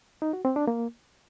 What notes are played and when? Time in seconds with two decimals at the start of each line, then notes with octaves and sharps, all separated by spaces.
0.22 D#4
0.33 F#4
0.45 C4
0.56 D4
0.67 A#3